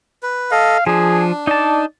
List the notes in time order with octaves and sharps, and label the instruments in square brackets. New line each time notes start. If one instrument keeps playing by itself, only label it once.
[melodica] B4
[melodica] A4 D#5 [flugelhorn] F5
[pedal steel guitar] F3 [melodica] D4 [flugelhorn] G#4
[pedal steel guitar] D#4 A5 [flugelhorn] D5